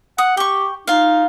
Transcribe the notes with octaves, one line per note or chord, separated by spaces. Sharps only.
F#5 D#6
G4 G5 C#6
D#4 F4 F5